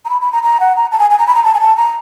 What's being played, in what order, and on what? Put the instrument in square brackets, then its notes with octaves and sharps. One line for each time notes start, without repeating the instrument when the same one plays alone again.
[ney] A#5
B5
B5
A#5
A#5
F#5
A#5
A5
G#5
G#5
A#5
B5
A#5
A5
G#5
A5
A#5